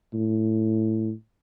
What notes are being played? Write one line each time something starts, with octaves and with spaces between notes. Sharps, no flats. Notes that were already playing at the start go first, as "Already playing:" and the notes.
A2